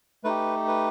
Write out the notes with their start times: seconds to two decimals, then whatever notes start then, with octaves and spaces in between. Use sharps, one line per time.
0.24 A3 D#4 G4 B4
0.68 B4